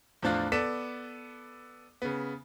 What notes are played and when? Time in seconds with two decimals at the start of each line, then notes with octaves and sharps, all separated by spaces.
0.22 E2 A2 F3 D4 F4 F#6
0.52 B3 A4 D5 B6 E7
2.02 C#3 B3